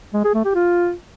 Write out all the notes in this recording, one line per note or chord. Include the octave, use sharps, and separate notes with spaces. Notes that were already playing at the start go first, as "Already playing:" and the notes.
G#3
G#4
A3
G4
F4